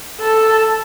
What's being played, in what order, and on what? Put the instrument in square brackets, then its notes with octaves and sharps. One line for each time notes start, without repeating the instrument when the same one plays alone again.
[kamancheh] A4